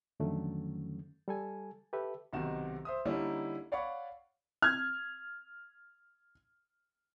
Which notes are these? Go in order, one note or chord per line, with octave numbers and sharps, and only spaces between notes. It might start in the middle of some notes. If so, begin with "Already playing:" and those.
F2 D3 D#3 F#3 A3 C#4
G3 A4 G#5
G4 A4 B4 E5
B1 C3 D#3 F#4 E7
C5 E5 D#6
D3 G3 A#3 C#4 D#4 E4
C#5 D5 F5 F#5 B5 C#6
F6 G#6